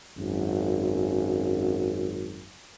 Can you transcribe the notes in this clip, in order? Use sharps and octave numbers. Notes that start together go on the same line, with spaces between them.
G#1 F#2